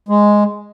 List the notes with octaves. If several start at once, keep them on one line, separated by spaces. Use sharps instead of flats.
G#3